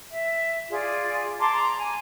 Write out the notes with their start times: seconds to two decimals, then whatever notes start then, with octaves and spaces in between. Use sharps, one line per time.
0.10 E5
0.69 F4 G#4 D5
1.39 A5 A#5 C6 D6
1.54 A#5
1.76 G#5